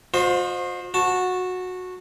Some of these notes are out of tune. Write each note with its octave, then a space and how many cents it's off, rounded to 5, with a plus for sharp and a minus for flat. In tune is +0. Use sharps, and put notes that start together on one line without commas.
F4 +45 C5 +0 D#5 -20
F#4 -15 A5 +0